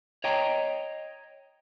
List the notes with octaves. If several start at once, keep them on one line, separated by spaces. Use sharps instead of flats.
C#5 D#5 G5 A#5